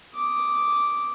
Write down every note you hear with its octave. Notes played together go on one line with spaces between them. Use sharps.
D6 D#6